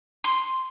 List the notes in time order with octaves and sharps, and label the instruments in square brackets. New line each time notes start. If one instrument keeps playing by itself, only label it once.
[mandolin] C6